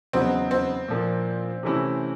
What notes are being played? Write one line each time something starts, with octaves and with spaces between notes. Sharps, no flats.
E2 C#3 F#3 B3 C4 D#4
C4
A#2 F3 A#3 D4
C3 E3 A3 C#4 E4